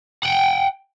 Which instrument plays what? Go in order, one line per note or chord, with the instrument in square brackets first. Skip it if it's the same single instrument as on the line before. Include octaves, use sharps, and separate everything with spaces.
[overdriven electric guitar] F#5 G5